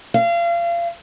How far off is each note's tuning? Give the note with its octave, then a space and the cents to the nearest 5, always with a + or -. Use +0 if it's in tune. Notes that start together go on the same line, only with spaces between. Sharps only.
F5 -35